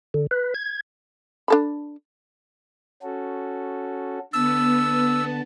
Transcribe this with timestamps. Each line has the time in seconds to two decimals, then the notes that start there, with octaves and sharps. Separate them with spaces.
0.14 D3
0.31 B4
0.55 G#6
1.48 D4 A4 B5
3.03 C#4 F#4 A4
4.33 D3 B3 A5 E6